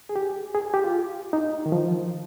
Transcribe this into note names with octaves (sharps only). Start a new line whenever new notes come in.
G#4
G4
G#4
G4
F4
D#4
D#3
F3